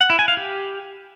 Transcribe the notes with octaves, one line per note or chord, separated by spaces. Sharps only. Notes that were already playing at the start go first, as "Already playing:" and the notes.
F#5
E4
G#5
F5
G4